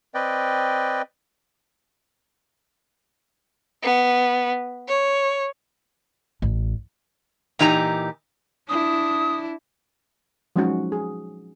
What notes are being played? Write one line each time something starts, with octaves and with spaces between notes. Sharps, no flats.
C4 B4 D5 D#5 G5
B3
C#5
A1
A#2 E3 D#4 G4 A#5
D4 E4 D#6
F3 F#3 G#3 C#4 D#4 F#4
G#4